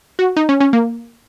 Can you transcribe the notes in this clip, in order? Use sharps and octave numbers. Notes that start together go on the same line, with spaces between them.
F#4
D#4
C#4
C#4
A#3